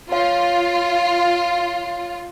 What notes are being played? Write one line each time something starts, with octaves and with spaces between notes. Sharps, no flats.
F4 C#5 F5